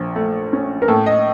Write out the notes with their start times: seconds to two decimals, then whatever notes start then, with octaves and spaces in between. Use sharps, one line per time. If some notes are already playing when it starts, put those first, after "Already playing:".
Already playing: A#1 A#2
0.16 A3
0.53 C#4
0.82 A#4
0.88 A2 A4
1.06 D#5